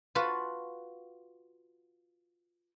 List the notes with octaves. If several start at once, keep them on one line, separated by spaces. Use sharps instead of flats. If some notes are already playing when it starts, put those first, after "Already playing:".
F4 F#4 B4 F#5 A5 B5